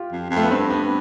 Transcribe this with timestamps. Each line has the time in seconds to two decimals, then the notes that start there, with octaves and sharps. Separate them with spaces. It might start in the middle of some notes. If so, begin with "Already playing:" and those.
Already playing: F4 G4
0.12 F2
0.31 F2
0.36 A3
0.43 B3
0.50 G2 C4
0.70 B3